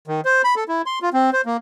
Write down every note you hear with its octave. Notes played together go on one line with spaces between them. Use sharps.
D#3
C5
B5
A4
E4
C6
F4
C4
C5
A#3